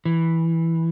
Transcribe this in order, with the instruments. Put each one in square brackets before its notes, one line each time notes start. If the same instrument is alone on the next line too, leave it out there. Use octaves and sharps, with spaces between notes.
[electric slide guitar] E3